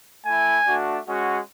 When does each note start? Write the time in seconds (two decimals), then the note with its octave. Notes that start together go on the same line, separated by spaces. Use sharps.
0.24 A3 E4 G#5
0.65 A3 D4 F#4
1.06 G#3 C#4 F#4